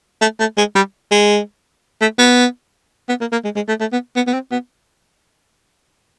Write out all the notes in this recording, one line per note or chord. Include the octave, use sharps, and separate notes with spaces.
A3
A3
G#3
G3
G#3
A3
B3
B3
A#3
A#3
G#3
G#3
A3
A3
B3
B3
B3
C4
B3